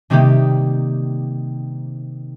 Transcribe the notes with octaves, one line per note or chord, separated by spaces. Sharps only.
C3 D#3 G3 A#3 D#4 G4